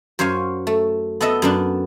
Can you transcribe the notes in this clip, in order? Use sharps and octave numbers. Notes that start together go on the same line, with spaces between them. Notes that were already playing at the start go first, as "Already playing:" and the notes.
F#2 C5 C#5 F5 G#5
A3
B3 A4 D#5 E5
F#2 B3 D4